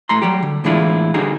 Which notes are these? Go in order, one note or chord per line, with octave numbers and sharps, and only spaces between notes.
A2 A3 A#5 C6
F#3 G3 G4
D3
A2 E3 G#3 D4 E4 F4
D3 G3 D#4 F#4 G#4